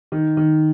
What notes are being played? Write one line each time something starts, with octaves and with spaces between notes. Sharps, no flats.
D#3
D#3